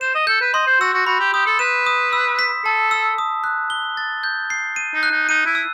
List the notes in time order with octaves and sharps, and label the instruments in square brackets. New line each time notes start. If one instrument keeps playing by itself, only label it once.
[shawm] C5 [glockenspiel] E7
[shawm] D#5
[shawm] A4 [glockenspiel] G6
[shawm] B4
[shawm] D#5 [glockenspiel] C6
[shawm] C5
[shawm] F#4 [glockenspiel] E6
[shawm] F#4
[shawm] F#4 [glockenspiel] B5
[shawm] G4
[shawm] G4 [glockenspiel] D#6
[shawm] A4
[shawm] B4 [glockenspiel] E7
[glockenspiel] D#6
E6
B6
[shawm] A4 [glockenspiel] A5
[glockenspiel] E6
D#6
F#6
G7
A6
G6
C7
D#7
[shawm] D#4
[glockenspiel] F#6
[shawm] D#4
[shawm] D#4 [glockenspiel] D#7
[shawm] E4
[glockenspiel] E6